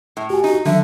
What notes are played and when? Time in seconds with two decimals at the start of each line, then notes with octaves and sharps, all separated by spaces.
0.17 A2
0.30 F#4 G4 G#5
0.44 D#4 F#4
0.66 D3 D#3 F#3 E5